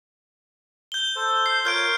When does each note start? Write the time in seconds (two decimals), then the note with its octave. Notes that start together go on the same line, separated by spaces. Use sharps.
0.92 G6 G7
1.16 A4 C5
1.46 C7
1.65 F4 A#4 C#5 F6 G6 D7